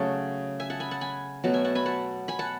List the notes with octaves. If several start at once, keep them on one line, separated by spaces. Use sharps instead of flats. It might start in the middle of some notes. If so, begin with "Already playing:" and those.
Already playing: C#3 F#3 A3 F#5 A5
E5 G#5
F#5 A5
G#5 B5
F#5 A5
G#5 B5
B2 F#3 A3 F#5 A5
E5 G#5
F#5 A5
G#5 B5
F#5 A5
G#5 B5
F#5 A5